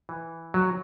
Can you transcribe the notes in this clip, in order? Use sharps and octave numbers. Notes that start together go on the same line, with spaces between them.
E3
F#3